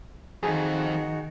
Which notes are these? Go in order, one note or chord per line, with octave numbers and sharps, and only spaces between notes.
F2 D#3 D#4 F#4 G#4 G#5